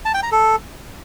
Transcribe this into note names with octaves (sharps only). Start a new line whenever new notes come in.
A5
G5
A#5
A4